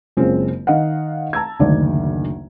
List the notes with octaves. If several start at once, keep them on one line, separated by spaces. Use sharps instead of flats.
F#1 G#3 C4 C#4 F4
D#3 D#5 F5 F#5
A5 A#5 E6 G#6
F#1 D2 D3 D#3 D5